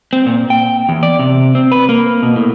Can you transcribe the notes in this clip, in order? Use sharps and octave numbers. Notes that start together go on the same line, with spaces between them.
C4
A#2
G5
E2
D5
C3
C4
B4
A#3
B2
A2